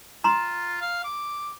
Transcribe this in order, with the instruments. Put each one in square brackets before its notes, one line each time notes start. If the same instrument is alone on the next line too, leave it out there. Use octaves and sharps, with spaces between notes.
[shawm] F4 [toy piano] A#5 C6
[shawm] F5
D6